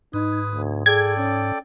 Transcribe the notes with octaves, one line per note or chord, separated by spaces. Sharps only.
G#2 D#4 B4 D#6
D2
G#4 A4 D5 G5 G#6
C#4